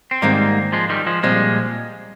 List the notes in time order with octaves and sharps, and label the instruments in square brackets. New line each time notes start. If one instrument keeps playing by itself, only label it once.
[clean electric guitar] C4
[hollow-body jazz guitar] G#2 D#3 G#3 C4 [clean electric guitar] G3 A#3
[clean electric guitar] F3 G#3
D#3 G3
F3 G#3
[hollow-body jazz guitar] A#2 G3 C4 [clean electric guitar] F3 G#3